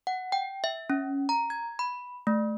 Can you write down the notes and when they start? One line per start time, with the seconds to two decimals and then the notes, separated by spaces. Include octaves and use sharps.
0.07 F#5
0.32 G5
0.64 E5
0.90 C#4
1.29 A#5
1.50 G#6
1.79 B5
2.27 A3